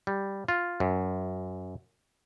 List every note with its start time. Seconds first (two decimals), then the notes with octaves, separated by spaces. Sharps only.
0.07 G3
0.48 F4
0.80 F#2